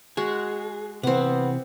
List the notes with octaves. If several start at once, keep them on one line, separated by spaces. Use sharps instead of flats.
G#3 F#4 G#4
C3 E3 B3 C4 F#5